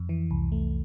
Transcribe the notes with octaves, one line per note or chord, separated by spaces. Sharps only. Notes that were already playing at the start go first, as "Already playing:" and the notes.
Already playing: F2
E3
C2
A3